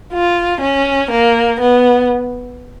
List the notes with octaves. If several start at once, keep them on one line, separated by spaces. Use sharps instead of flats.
F4
C#4
A#3
B3